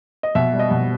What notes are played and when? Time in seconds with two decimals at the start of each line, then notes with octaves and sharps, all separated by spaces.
0.23 D#5
0.35 B2 E5
0.53 G3
0.59 D#5
0.71 B2